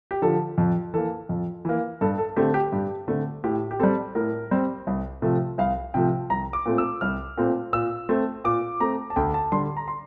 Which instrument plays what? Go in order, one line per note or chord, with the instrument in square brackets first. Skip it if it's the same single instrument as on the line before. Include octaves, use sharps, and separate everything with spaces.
[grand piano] G4
D3 F3 A4
F2
E3 A#3 A4
F2
E3 A#3
G2 A4
A4
D3 A3 C4 G4
G4
G2 G4
D3 A3 C4
A2 G4
G4
G3 C4 A4
A2 A#4
G3 C4
C2
C3 F3 A3
C2 F5
C3 F3 A3 G5
C2 A#5
D6
A#2 A3 C4
E6
C2 F6
A#2 A3 C4
A#2 E6
A3 C4
A#2 D6
A3 C4 A#5
A5
D2 G5
A5
D3 G3 C6
A#5
C6